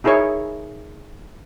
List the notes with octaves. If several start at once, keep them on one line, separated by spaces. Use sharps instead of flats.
D#4 E4 G#4 A#4 C#5